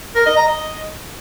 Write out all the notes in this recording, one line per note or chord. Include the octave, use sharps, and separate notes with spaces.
A#4
D#5
A#5
D#5